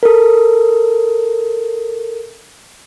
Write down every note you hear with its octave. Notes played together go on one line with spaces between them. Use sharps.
A4 A#4